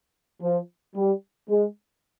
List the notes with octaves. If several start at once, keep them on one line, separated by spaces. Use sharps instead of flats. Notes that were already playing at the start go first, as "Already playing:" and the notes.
F3
G3
G#3